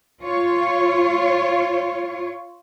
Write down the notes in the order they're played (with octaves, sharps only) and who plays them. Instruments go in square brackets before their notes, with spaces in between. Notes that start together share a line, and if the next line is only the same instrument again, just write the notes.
[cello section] F4 C#5